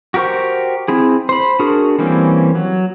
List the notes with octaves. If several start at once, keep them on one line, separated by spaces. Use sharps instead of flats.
F#4 G4 A#4 C5 C#6
C4 E4 G#4
C5 B5
D4 F#4 G#4 A#4
E3 G3 A#3 C4 C#4
F#3